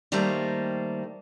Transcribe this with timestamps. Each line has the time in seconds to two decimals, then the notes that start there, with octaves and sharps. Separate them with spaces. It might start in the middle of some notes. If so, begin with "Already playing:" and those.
0.12 D#3 G3 A3 A#3 C5 A#5